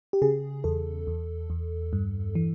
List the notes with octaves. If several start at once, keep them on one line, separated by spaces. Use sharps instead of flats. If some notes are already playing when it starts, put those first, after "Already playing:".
G4
C#3 G#4
E2 A4
E2
E2
G2
E3